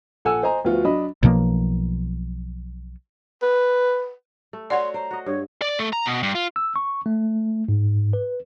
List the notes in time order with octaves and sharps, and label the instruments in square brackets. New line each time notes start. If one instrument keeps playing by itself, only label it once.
[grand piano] A#1 A4 F#5 G#5 E6
C5 D#5 G#5 A#5
D2 F3 B3 F4 F#4
F#3 D4 D#5 B5
[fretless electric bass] B1 B2 F3 A#3
[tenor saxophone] B4
[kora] A3
[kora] F#4 C#5 [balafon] D5 F#5 [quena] C6
[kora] C5 [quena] A#5
[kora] F#4 D#5
[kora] G2 [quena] C#5
[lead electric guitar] D5
A3
A#5
B2
G2
F4
[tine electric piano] E6
C#6
A3
G#2
B4